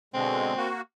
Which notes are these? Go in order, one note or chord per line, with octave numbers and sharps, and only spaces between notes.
B2 D3 G#3 C4
A#3 F#4